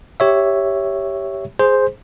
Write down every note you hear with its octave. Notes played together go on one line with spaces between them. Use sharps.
G4 C#5 E5
G#4 C5